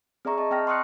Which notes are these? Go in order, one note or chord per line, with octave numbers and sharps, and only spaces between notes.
C4 G#4 D5 E5 A#5 C#6
D#5 A5
C4 G5 A5 F6 A#6
C6 C#6 D#6 F6 F#6 C#7